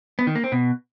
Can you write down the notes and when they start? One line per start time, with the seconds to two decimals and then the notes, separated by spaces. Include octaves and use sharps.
0.19 B3
0.27 D#3
0.35 A#3
0.44 C4
0.52 B2